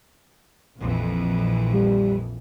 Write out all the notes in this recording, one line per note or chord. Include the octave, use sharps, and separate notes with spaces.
A#1 F2 E3
G3